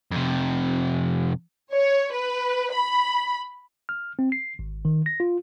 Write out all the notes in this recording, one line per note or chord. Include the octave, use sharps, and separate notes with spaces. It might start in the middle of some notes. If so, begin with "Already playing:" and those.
F2 C3
C#5
B4
B5
F6
C4
C7
G#1
D#3
A#6
F4